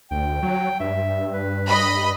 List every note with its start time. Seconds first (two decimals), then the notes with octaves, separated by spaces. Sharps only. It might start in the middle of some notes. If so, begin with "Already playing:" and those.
0.11 D2 G5
0.43 F#3
0.80 G2 E5
1.32 B4
1.67 D#5 B5